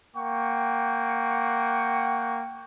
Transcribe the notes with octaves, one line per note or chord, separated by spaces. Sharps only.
A#3 F#5 G5 C#6